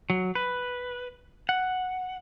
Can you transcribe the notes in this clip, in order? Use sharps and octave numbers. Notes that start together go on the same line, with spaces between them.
F#3
B4
F#5